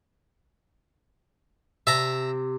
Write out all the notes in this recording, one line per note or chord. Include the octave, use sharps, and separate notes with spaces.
C3 E5 A5 A#5